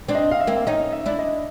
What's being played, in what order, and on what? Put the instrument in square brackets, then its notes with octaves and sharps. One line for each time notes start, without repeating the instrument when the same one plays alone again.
[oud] C4 D4
[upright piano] D#5
F5
E5
[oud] A#3 C4
[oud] C#4 D#4 [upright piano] D#5
[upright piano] E5
[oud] D4 E4
[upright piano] D#5